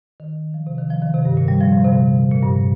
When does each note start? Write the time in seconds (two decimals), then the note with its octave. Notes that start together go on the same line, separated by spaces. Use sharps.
0.20 D#3
0.54 F3
0.67 C3
0.78 D#3
0.90 F3
1.02 D#3
1.14 C3
1.25 G2
1.37 A#2
1.48 G3
1.61 F3
1.85 C3
2.31 A#2
2.43 G2